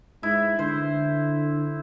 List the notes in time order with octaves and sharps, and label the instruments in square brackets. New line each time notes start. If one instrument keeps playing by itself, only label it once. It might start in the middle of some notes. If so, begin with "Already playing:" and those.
[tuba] G#2 [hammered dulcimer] E4
[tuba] D3 [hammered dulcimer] C5